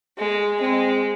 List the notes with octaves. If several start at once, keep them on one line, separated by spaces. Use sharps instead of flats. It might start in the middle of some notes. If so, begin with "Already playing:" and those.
G#3
G#3 C4